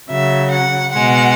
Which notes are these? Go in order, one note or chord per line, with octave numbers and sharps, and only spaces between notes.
C#3 F#3 E5
F#5
B2 G#3 F#5